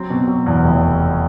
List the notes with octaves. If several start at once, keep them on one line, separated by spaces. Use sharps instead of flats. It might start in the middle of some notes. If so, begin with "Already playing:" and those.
Already playing: F#3 C4
B2
F#3
E2
F1